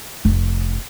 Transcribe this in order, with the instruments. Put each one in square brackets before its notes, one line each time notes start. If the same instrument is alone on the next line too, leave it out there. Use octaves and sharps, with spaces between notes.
[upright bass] F1